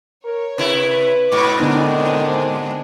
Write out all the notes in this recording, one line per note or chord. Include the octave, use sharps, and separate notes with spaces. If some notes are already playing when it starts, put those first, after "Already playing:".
A#4 C#5
C3 E4 B4
G#2 B2 B5 C#6 D6
D3 D#3 G#3 B3 C4 D4 D#4